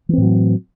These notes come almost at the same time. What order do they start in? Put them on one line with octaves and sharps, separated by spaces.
E3 C4 A2 F#3